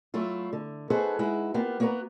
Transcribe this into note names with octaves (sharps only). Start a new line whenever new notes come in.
F#3 A3 E4 F4
D3
D#4 F#4 G#4 A4 B4 C5
G#3 D#4 E4 F#4
A#3 B3 F4 G4
A#3 B3 F#4 A#4 B4 A#5